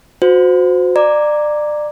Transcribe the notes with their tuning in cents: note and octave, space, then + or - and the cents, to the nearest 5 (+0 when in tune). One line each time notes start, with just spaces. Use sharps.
F#4 -25 C5 -20
D5 +25 A#5 +0 D6 +0